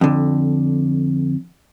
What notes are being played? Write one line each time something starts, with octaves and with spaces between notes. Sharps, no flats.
F2 D3